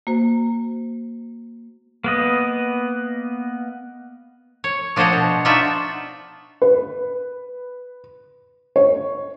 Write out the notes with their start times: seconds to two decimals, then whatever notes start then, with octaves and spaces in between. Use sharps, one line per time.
0.07 A#3 F#4 C5
2.04 A#3 B3 D#5
4.64 C#5
4.96 F3 D4 F#4 C5 C#5 D#5
5.12 B2
5.45 D4 D#4 F4 F#4 E5
6.62 B4
8.76 C#5